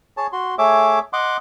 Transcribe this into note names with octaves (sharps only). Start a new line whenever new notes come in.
G#4 C#5 A5
F#4 C6
A3 G#4 C#5 E5 D6
D#5 F#5 C6 D6